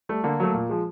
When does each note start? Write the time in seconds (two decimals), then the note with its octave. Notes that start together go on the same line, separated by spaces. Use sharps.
0.09 G3 A3
0.24 D3 A#3
0.40 F#3 A3
0.54 A#2
0.69 F3 G#3